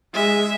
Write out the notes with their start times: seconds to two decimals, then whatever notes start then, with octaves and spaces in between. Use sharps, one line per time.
0.14 G#3 E5